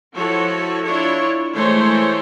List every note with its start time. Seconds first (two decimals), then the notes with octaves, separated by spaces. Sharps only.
0.14 F3 E4 F#4 A4 C#5
0.84 D4 E4 F4 C#5
1.54 E3 G#3 A3 A4 C5 C#5